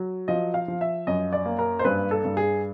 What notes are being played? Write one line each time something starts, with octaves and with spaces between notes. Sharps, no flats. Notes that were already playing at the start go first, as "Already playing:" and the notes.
Already playing: F#3
F3 D#5
F5
F3
E5
F#2 D#5
D5
A#3
A#4
C5
G2 B4
A4
G2
G#4